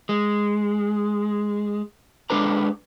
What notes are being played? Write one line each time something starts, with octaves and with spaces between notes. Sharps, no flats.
G#3
G#3 D4 A4 B4 A#5